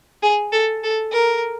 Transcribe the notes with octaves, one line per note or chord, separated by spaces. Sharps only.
G#4
A4
A4
A#4